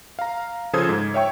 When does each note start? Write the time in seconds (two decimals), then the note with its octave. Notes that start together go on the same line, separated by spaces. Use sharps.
0.19 F5 A#5
0.73 C#3 F3 A4 C5 D#6 G#6
0.89 G#2
1.14 C#5 E5 G5 C#6